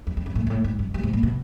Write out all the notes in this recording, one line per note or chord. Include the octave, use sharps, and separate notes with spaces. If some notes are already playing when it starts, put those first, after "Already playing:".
F2
F2
F#2
A2
G#2
A2
G#2
F#2
G2
G#2
A#2
B2